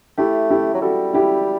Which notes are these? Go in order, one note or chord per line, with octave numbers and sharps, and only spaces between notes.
A3 E4 G4
E4 G4
F#3
G3 F#4 A4
E4 G4